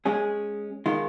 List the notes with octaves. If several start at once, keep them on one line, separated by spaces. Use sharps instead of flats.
G#3 C#4 G#4
D#3 G#3 F4